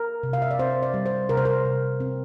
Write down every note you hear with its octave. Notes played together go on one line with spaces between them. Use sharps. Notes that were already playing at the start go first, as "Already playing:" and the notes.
Already playing: A#4
C3
F5
E5
D5
C4 C5
D5
G3
C5
C3 A#4
C5
A#4
C3
C4